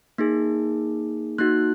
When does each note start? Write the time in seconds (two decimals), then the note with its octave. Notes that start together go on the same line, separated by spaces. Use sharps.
0.18 A#3 D#4 G#4
1.38 A#3 D#4 F#4 F#6